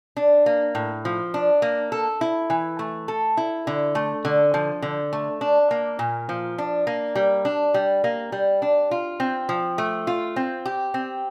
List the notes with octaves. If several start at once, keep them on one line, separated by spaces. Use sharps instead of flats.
D4
A#3
A2
F3
D4
A#3
A4
E4
E3
A3
A4
E4
D3
A3
D3
F3
D3
A3
D4
A#3
A#2
F3
D4
A#3
G3
D4
G3
A#3
G3
D4
F4
C4
F3
A3
F4
C4
G4
C4